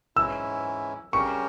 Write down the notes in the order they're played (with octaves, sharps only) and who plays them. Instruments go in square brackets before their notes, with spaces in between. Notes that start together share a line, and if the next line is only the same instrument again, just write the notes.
[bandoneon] G#2 E3 G#3 C#4 E4 [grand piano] E6
[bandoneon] C#3 G3 C#4 G4 A#4 [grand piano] C#6